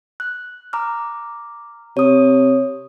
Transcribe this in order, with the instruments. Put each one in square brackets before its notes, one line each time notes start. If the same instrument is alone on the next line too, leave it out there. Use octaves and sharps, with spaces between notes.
[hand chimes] F#6
A#5 D6 F6
[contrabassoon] C3 [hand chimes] C#5 D#6